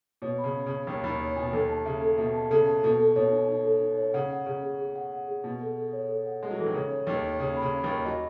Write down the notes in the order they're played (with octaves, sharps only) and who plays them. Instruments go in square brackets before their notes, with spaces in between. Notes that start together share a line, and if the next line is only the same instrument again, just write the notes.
[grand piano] B2 [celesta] C#5
[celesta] B5
[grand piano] C#3
[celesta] C#5
[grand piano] C#3 [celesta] C#5
[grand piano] D#2 D#3 [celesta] C#5
[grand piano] D#2 D#3 [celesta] B5
[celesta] C#5
[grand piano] B2 [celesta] G#5
[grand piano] D#2 D#3 [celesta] A4
[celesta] A5
[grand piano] C#3 [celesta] E5
[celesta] A4
[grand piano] B2 [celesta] E5
[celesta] A5
[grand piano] C#3 [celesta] A4
[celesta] A5
[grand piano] B2 [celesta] A4
[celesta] A4
[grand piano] B2 [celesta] C#5
[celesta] D#4
D#4
A4
D#4
C#5
[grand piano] C#3 [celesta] F#5
[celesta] F#5
[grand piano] C#3 [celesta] G#4
[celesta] G#4
G#4
F#5
F#5
G#4
[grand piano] B2 [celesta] F#5
[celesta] A4
A4
C#5
A4
F#5
[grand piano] G#3 [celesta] F#5
[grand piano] F#3
[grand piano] E3 [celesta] A4
[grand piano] D#3
[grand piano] C#3 [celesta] C#5
[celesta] C#5
[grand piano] D#2 D#3 [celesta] C#5
[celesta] C#5
[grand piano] C#3 [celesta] C#5
[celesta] B5
[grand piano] C#3
[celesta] B5
[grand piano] D#2 D#3
[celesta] B5
[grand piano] F#3 [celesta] D#5